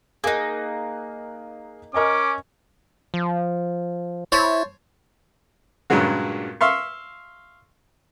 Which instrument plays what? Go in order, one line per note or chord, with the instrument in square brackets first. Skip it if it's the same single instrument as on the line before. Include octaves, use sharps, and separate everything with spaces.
[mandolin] A#3 D#4 [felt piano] G#4 A#4 F#6
[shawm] C#4 [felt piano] A#4 D#5 G#5 [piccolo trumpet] D6
[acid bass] F3
[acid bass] E4 [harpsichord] C5 C#5 A5
[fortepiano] G2 A#2 C#3 F#3 G#3 F#4
E5 F5 C6 C#6